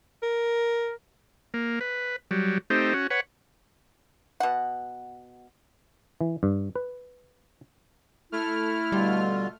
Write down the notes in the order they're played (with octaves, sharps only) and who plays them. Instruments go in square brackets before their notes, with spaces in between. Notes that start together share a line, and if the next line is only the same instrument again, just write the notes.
[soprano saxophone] A#4
[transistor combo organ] A#3
B4
F#3 G3
A3 C4 D#4 G4
C#4 F#4
B4 C#5 F#5
[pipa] B2 F#5
[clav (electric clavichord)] E3
G2
B4
[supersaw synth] A3 F6 [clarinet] E4
[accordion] B2 D3 F4 [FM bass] G3